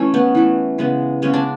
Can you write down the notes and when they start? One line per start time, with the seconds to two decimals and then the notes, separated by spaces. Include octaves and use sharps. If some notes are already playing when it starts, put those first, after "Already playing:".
Already playing: E3 A3 C#4
0.14 B3
0.35 E3 A3
0.78 C#3 G#3 B3
1.22 C#3 G#3 B3 C#4
1.34 D4